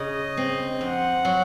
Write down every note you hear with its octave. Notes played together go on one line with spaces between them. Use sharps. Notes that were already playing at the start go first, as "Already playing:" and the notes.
Already playing: C#3 D#5
C4
F2 F#5
F#3